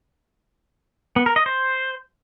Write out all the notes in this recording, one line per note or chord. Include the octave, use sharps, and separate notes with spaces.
B3
A#4
D#5
C5